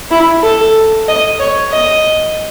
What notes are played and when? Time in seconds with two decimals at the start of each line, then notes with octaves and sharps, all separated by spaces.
0.11 E4
0.43 A4
1.08 D#5
1.39 C#5
1.72 D#5